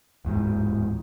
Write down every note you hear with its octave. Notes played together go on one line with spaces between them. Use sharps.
D1 E2 G#2